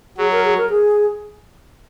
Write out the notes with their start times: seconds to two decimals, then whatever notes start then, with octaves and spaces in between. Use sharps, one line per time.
0.17 F#3 G#4
0.31 A#4
0.44 G#4
0.57 A#4
0.70 G#4